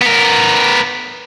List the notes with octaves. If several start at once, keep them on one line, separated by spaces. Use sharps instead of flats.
B3 A#4